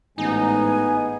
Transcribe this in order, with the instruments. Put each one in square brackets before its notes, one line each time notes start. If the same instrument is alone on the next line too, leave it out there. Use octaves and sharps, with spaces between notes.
[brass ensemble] A1 G#2 [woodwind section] B3 [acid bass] D#4 [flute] G#5